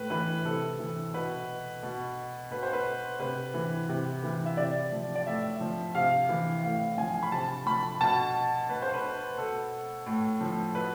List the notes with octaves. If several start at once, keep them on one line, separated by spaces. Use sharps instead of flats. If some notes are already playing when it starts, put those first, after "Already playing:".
Already playing: A2 B4
E3 B4
C3 A4
E3
B2 B4
B2
B2 B4
C5
B4
C3 B4
E3
C3
E3
E5
C3 D5
F3
D5
A2 E5
F3
C3 F5
E3
A2 F5
F3 G#5
B5
C3 A5
F3 B5
B2 A5
B2 B4
C5
B4
B2 A4
A2
F3
B2 B4